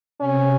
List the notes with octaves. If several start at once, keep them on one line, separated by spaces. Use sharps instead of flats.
C3 C#4